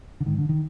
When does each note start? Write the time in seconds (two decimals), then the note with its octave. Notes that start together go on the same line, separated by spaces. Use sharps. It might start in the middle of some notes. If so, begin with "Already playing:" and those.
0.21 D3
0.26 G#2 D#3
0.38 D3
0.49 D#3